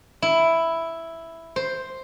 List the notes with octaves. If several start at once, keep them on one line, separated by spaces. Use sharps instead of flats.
E4
C5